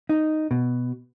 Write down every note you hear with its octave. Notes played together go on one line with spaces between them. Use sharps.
D#4
B2